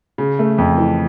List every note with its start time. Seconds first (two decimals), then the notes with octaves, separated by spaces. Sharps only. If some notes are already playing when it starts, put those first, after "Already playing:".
0.18 C#3
0.39 A3
0.58 F2
0.78 E3